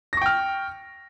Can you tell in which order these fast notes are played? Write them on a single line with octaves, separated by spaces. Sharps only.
A#6 C#6 G5 F6